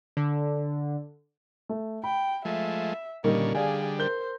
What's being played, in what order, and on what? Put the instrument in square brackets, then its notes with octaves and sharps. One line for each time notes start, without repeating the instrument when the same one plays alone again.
[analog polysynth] D3
[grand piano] A3
[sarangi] G5 [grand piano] B5
[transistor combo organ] F3 G#3 A3 [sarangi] E5
[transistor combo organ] A#2 D3 C#4 [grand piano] D#3 G3 A#3 [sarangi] D#4
[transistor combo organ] D3 G3 [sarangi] G#4 [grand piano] D5 F5 G#5
[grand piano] A#4 G6 G7 [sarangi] C5